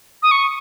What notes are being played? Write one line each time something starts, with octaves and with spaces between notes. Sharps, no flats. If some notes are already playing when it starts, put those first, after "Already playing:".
D#6
C#6